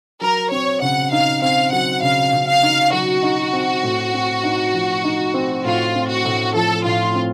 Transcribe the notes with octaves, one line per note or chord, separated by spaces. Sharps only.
F#3 A#4
C4 C#5
C#3 F#5
D#4 F5
C4 F5
F#3 F#5
C#3 F5
C#3
F5
D#4
F#3 F#4
D#4
C4
A2
C4
D#4
F3
D#4
C4
A2 F4
C4
F#4
A2
F3 A4
A2 F4
C4